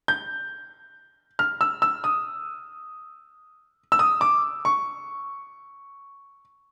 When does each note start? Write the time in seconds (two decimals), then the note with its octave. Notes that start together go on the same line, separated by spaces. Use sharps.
0.08 G6
1.39 F6
1.61 E6
1.82 E6
2.04 D#6
3.92 E6
3.99 D#6
4.21 D6
4.65 C#6